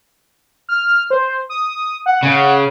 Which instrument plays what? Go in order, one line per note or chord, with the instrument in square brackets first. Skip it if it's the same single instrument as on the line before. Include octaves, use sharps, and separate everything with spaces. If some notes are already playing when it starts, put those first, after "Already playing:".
[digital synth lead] F6
C5
D#6
F#5
[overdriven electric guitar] C#3